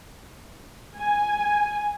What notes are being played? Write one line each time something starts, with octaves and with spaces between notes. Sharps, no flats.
G#5